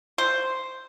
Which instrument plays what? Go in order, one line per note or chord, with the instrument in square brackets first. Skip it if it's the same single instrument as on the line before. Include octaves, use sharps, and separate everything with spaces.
[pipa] C5